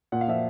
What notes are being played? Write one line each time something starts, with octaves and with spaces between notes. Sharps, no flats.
A#2 F#5
F5
F3 E5